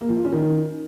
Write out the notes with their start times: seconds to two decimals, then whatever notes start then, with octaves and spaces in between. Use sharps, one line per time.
0.01 A#3
0.09 F3
0.17 F4
0.24 C#4
0.32 D#3